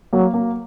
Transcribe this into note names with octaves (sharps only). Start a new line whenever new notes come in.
F#3 A#3
A#3